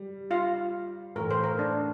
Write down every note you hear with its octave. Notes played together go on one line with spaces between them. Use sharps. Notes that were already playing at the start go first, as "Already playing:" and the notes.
Already playing: G3
F4 F5
A2 E3 A3 A#4
C5
A#4
D4